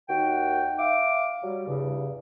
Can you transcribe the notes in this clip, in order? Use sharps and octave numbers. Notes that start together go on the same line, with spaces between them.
D#2 D#3 F#4 F#5 G5
E5 F5 D6
F#3 G3
E2 G2 C#3